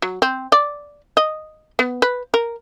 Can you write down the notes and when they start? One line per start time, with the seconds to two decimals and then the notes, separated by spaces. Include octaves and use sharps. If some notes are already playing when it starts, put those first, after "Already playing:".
0.02 F#3
0.22 C4
0.52 D5
1.17 D#5
1.79 B3
2.02 B4
2.34 A#4